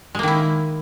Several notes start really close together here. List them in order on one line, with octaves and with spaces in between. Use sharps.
G#3 A#3 D#3 E4